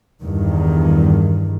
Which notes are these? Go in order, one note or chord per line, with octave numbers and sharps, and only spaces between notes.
E2 G2 D#3